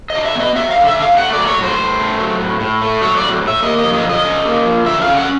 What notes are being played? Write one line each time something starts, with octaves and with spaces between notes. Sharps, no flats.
D#5
D4
E5
B3 D#5
F#3 E5
F5
D3
E5
D4 F5
A3 F#5
D5
F#3
C#5
A2
C5
A2
A3
F#3
A2
A2
A3
F#3 C#5
D5
A2
A2 E5
A#3 D#5
F3 D#5
D#5
D3
D#5
C#4
A#3
F3
D3 E5
C#4 F5
F#5